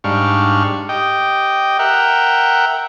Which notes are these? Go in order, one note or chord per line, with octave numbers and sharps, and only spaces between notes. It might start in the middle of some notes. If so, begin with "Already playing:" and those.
G#2 G3 D4 F5 C#6
G4 D#5 G5
A#4 E5 F#5 G5